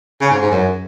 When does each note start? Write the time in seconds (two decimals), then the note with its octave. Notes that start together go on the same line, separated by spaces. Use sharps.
0.21 C#3
0.31 G#2
0.42 G#2
0.51 F#2